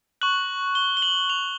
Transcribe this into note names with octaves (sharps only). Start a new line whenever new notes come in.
C#6 F#6 F#7
G7
G7
F#7
F7